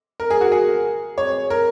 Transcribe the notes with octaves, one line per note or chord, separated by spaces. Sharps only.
A#4
G#4
F#4
G#4
C#5
A#4